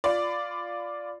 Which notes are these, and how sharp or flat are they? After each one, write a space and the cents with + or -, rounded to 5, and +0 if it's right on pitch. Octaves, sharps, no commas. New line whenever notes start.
F4 +0 D5 +0 B5 +30